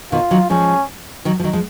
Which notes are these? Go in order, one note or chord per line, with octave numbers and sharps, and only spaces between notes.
B2 D#3 F4
D#3 F#3
F3 G#3 C#4
D#3 F#3
F3
D#3 F#3
F3 G#3